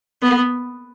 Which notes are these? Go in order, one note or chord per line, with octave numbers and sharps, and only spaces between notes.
B3